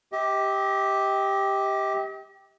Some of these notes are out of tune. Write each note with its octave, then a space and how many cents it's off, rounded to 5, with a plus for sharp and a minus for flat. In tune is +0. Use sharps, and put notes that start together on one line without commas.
G4 +0 D#5 +45